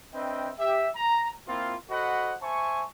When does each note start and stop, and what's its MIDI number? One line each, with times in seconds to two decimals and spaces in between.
0.13 0.51 60
0.13 0.51 62
0.13 0.51 71
0.13 0.51 75
0.13 0.51 76
0.13 0.51 79
0.58 0.89 67
0.58 0.89 76
0.95 1.31 82
1.47 1.75 58
1.47 1.75 60
1.47 1.75 64
1.47 1.75 65
1.89 2.34 66
1.89 2.34 69
1.89 2.34 72
1.89 2.34 75
1.89 2.34 78
1.89 2.34 83
2.41 2.85 72
2.41 2.85 76
2.41 2.85 80
2.41 2.85 81
2.41 2.85 85